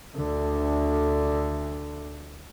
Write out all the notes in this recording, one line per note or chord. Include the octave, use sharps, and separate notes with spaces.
D2 D3